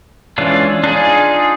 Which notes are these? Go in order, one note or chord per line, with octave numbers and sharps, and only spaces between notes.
E3 G#3 C#4 D4 F4
D4 D#4 F4 G#4